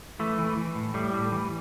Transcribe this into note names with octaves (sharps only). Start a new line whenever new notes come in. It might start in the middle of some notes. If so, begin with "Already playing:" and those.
E3 A3
E3
E3
A2
A2 G3
A2
E3